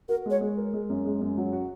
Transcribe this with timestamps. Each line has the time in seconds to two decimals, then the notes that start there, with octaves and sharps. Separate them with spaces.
0.09 F#4 A#4
0.26 G#3 C#5
0.41 G#3
0.57 A#4
0.73 G#3
0.90 F#2
1.05 G#3
1.21 F#2
1.37 F#3
1.53 F#4